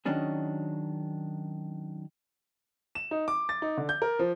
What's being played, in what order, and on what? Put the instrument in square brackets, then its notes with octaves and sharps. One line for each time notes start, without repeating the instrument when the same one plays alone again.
[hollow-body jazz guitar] D#3 F#3 C#4 D4 G#4
[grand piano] E7
D#4
D6
A6
D#4
D3
G6
A#4
F3